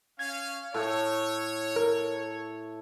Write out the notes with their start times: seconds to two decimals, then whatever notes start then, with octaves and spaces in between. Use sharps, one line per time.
0.19 C#4 F5 G#6
0.74 A2 A3 A4 C#5
1.76 A#4